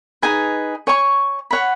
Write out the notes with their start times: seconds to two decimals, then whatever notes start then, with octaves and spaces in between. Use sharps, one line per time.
0.22 D#4 G#4 B4 G#5
0.87 C#5 G#5 C#6
1.51 C#5 F#5 B5